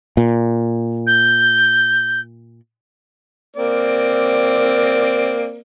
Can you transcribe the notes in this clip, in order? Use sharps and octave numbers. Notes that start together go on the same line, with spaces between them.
A#2
G6
A#3 C4 D5